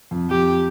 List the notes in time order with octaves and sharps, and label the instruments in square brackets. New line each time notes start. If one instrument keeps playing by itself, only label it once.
[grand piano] F2
[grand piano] F2 [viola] G4